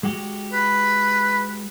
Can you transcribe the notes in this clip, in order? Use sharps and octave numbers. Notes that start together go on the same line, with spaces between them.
G#3 F#4 G4
B4